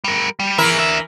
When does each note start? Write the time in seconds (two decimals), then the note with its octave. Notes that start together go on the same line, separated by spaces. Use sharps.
0.04 G3 A#4
0.39 G3
0.58 E3 E4 G#4 A#4 E5
0.79 D4 E5